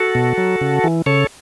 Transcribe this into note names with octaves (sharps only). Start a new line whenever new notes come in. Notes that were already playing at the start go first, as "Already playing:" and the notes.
Already playing: F#4 A4
B2
F#3
C#3
E3
C#3 A4 C#5